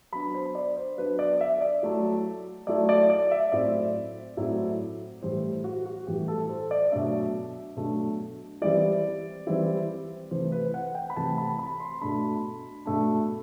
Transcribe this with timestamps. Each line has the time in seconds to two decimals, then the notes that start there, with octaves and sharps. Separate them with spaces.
0.13 F#3 B3 D4 B5
0.35 C5
0.55 D5
0.77 C5
0.98 F#3 B3 D4 B4
1.19 D5
1.41 E5
1.61 D5
1.83 F#3 A3 E4
2.67 F#3 A3 E4 D5
2.89 D5
3.10 D5
3.31 E5
3.52 A2 F#3 C4 E4 D5
4.37 A2 F#3 C4 E4
5.22 A2 E3 G3 C5
5.64 F#4
5.86 F#4
6.07 A2 E3 G3 G4
6.28 A4
6.49 C5
6.71 D5
6.92 B2 F#3 A3 D4 E5
7.77 B2 F#3 A3 D4
8.62 E3 G3 C4 E4 D5
9.47 E3 G3 C4 E4
10.31 C3 E3 A3 C5
10.52 B4
10.74 F#5
10.95 G5
11.10 B5
11.17 C3 E3 A3 A5
11.38 B5
11.59 B5
11.80 C6
12.01 B2 A3 D4 B5
12.86 B2 A3 D4